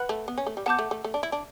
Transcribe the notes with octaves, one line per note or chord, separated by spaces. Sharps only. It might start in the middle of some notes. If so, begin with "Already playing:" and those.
Already playing: B4 F#5 B5 F#6
A3
B3
C#4
A3
G3
B3 F#5 A5 D6 G6
A3
A3
A3
D4
E4
D4